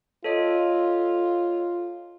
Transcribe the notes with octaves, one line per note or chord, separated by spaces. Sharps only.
F4 A4 C#5 D#5